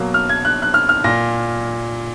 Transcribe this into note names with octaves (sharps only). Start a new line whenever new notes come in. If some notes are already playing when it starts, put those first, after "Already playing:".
Already playing: B2 F#3 A#3
F6
G#6
F#6
F#6
F6
F6
A#2 A#6